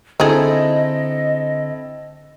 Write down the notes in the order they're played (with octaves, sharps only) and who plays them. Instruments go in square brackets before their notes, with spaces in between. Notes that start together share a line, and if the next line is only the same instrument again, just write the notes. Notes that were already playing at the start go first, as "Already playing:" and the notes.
[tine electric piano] D3 [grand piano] C4 E4 A4 [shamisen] D#4 G#4 [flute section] D#5